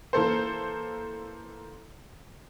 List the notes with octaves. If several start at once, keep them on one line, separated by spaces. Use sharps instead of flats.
E3 A#3 A4 C5